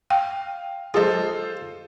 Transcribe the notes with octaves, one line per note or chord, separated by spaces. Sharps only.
F5 G5
G#3 F4 G#4 A4 C5